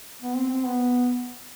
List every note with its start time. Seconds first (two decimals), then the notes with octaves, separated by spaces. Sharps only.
0.22 B3
0.36 C4
0.50 C4
0.65 B3